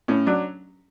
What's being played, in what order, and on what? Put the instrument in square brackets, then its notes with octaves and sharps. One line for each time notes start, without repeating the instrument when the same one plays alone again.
[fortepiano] A2 C#4
F#3 D4